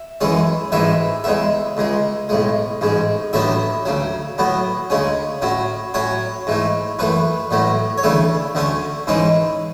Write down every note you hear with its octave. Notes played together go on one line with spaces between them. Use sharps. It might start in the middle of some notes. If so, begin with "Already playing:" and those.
Already playing: E5
F#2 E3 G#3 C#4
A1 G#2 E3 G#3 E5
E2 C#3 G#3 E5
C#2 C#3 G#3
B1 A2 G#3
A1 G#2 G#3
A1 A2 F#3 B3 D4 E5
D2 C#3 F#3
A2 F#3 B3
D2 C#3 G#3 C#4
A2 F#3 C#4
A2 F#3 C#4 C#5
G#2 E3 A3
F#2 E3 A3 B4
A1 A2 F#3 A3
C#5
D2 C#3 E3 A3 D5
D2 D3 A3 C#4
G#2 E3 G#3 C#4